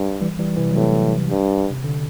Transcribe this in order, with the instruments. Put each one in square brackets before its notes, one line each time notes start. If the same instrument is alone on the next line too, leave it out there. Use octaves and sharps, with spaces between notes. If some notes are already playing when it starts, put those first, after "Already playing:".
Already playing: [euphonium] G2
[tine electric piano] E3 G3
E3 G3
C3 E3
F#3
[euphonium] A2 [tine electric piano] C3 E3
[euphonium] G2
[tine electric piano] C3
D3